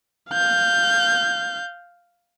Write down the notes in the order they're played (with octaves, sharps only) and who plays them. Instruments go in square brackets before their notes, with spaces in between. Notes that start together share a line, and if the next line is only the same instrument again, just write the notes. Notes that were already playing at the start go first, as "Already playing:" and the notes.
[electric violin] F5 G6